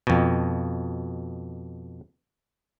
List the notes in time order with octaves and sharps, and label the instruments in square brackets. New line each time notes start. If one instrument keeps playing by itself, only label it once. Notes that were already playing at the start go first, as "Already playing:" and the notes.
[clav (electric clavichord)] F2 B2